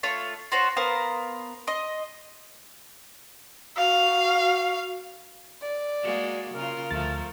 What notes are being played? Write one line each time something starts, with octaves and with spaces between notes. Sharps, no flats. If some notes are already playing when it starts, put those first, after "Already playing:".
A3 F4 C#5
F4 F#4 C5 C#5
B3 A#4 C5 F5
D#5 C6
F#4 F5
D5
G#3 A#3 F#4
C#3 F4 A#4
D2 F3 A3 A6